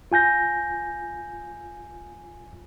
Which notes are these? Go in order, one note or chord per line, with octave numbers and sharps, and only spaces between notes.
F4 G#5 G6 A#6